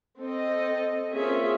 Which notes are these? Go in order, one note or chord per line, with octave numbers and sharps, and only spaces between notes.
C4 A4 D#5
A#3 C4 C#4 F4 G#4 E5